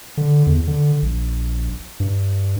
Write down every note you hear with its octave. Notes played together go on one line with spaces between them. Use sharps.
D3
E2
D3
A#1
G2